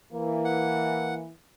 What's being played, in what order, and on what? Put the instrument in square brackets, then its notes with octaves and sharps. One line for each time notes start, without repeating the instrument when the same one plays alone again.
[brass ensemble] E3 [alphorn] A#3
[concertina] F#5